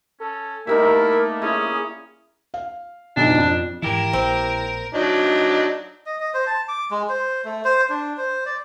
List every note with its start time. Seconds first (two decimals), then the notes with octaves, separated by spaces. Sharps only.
0.20 C#4 A4
0.67 G3 A3 A#3 D#4 E4 A#4
1.42 C#4 E4 G#4
2.54 F5
3.17 B1 F2 G#2 D4
3.38 F2
3.82 G#2 E3 E4 G4 A#4
4.13 A#1 C4
4.95 F#3 D4 D#4
6.06 D#5
6.20 D#5
6.34 C5
6.47 A5
6.68 D6
6.91 G#3
7.09 C5
7.45 A3
7.65 C5
7.90 D4
8.18 C5
8.46 D5